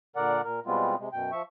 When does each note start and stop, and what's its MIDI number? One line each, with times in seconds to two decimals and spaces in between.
0.16 0.42 46
0.16 0.42 50
0.16 0.42 70
0.16 0.42 74
0.16 0.42 78
0.44 0.60 46
0.44 0.60 70
0.66 0.95 47
0.66 0.95 55
0.66 0.95 56
0.66 0.95 59
0.66 0.95 60
0.66 0.95 65
0.99 1.09 48
0.99 1.09 56
1.13 1.31 42
1.13 1.31 47
1.13 1.31 79
1.32 1.42 53
1.32 1.42 76
1.32 1.42 85